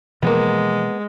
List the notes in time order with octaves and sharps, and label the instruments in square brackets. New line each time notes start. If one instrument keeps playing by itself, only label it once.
[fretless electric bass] B2 E3 F3 [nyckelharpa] G#3 [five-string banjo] A#3 B3